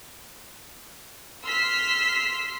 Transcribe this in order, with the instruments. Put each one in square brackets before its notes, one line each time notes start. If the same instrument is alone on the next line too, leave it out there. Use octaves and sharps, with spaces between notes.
[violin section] C6 E6 F6 B6 C7